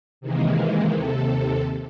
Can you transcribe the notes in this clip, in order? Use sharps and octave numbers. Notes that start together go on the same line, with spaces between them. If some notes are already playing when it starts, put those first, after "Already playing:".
C3 D#3 E3 G#3 A#3
D#2 C3 A4